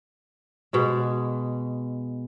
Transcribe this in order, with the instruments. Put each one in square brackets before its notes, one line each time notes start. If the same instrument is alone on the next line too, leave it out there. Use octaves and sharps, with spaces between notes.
[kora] B2 G#3